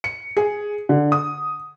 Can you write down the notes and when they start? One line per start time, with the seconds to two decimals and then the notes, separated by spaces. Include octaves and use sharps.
0.04 C#7
0.37 G#4
0.89 D3
1.12 D#6